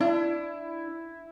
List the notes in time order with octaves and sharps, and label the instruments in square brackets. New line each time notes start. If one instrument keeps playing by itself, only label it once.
[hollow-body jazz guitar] D4 [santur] E4